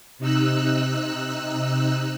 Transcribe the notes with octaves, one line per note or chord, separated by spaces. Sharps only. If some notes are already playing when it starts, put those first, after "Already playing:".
C3 D#4 E6 F#6